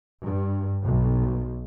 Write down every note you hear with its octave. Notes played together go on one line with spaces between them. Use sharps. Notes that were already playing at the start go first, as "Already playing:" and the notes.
G2
B1